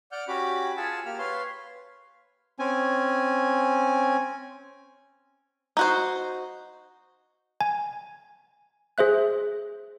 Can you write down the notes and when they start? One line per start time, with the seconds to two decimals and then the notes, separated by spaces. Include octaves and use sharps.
0.12 D5 F#5 F6 G6
0.28 C#4 F#4 G4 B5 D6
0.77 F4 G#4 F#5 G#5 A5 E6
1.05 A#3 G4 F6
1.19 B4 C#5 F5 C6
2.59 C4 C#4 G#5
5.77 D#4 F#4 C5
7.61 G#5
8.98 G#4 C5 E5 F#6